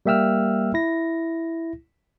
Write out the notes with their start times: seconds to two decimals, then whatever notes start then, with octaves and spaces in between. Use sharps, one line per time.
0.06 G3 A#3 E5 G5 E6 F6
0.74 E4 A#6